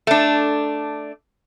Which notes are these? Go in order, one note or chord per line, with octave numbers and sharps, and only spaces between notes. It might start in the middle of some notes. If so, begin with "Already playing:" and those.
A3 D4